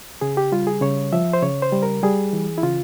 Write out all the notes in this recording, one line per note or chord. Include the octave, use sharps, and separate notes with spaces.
C#3 G#4
G4
G3 F4
G#4
C#3 C#5
F3 E5
C5
C#3 C#5
C5
G3
A#4
G3 G#4
E3
E4
C#3 F4